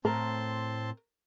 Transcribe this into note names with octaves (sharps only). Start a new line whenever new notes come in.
A2 C4 A#4 A5 C6